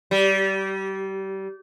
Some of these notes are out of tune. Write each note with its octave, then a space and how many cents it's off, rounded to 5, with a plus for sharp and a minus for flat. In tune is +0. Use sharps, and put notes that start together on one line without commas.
G3 -25